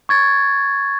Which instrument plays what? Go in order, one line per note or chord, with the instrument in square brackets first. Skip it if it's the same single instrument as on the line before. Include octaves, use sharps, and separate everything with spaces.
[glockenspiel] C#6 G#6 A6